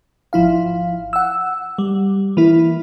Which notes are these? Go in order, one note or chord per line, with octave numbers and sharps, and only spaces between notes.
G#1 F3 E4 F5
F#5 E6
G3
E3 A#3 E4